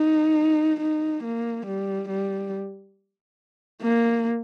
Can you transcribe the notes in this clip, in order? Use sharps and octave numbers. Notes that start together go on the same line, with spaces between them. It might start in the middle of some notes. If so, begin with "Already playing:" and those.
Already playing: D#4
D#4
A#3
G3
G3
A#3